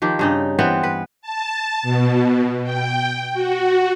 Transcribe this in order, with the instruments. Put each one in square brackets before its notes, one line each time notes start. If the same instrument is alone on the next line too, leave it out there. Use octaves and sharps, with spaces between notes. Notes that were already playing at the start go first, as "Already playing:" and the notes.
[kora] D#3 F3 G4
G2 C#3 D#4
E3 B3 C4
B4
[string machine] A5
B2
G5
F#4